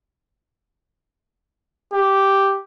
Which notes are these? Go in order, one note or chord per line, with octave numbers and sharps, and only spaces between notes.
G4